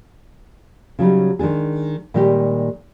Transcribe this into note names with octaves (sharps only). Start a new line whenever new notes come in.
C#3 F#3 G3 D#4
D#3 G#3 D4 G#4
A#2 D#3 G3 G#3 G4